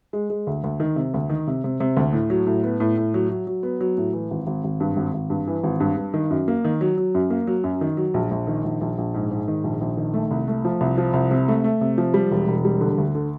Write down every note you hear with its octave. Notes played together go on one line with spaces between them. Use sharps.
G#3
G#3
D2
D2
D#3
C3
D2
D#3
C3
C3
C3
D2
A2
F#3
A2
B3
A2
A2
F#3
F#3
F#3
B3
F#3
A2
E3
G#1
G#1
G#1
G2
G#1
G#1
G2
E3
G#1
G2
G2
D#3
F#2
A#3
D#3
F#3
F#3
F#2
A#3
F#3
F#2
D#3
F#3
A#1
A#1
D#3
A#1
A#1
A#1
G#2
G#2
D#3
A#1
A#1
D#3
A3
C2
A3
F3
C2
F3
C2
C3
A3
A3
C3
F3
G3
E1
E1
G3
D3
D2
D3